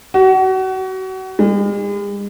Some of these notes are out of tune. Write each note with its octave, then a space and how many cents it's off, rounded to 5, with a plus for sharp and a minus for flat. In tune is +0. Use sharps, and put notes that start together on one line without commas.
F#4 +30
G#3 -45